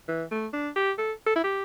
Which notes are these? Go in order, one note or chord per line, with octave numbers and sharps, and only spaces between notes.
E3
A3
D4
G4
A4
A4
E4
G4